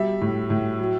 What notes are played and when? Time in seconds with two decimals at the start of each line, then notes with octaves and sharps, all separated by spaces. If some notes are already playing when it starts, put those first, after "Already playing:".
Already playing: B2 G3 E5
0.21 A2
0.50 A2
0.79 F#3